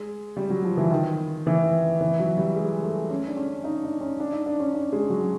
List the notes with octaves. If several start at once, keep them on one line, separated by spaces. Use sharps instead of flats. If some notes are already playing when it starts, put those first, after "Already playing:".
Already playing: G#3
G3
F#3
F3
E3
D#3
E3
E3
F#3
G3
G#3
A3
C#4
D4
C#4
D#4
D4
C#4
D4
D#4
D4
C#4
D4
G#3
F#3